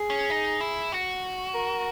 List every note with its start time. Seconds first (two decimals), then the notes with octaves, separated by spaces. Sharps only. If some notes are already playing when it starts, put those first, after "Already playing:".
Already playing: G#4
0.10 C#4
0.30 D#4
0.61 E4
0.92 F#4
1.55 A#4